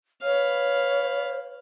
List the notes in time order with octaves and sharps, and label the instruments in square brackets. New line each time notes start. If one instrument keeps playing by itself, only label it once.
[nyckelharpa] B4 F5 [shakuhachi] C#5